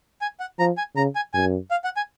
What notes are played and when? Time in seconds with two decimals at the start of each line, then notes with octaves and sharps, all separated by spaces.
0.21 G#5
0.40 F#5
0.59 F3 A#5
0.77 G#5
0.96 C#3 A#5
1.15 G#5
1.34 F#2 G#5
1.71 F5
1.84 F#5
1.97 G#5